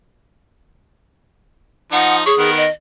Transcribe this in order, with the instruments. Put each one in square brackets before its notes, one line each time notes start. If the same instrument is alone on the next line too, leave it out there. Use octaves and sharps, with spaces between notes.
[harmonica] F3 D#4 [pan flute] F#5
[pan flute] G#4 [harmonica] C#5
[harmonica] D#3 B3 A#4
[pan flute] D#5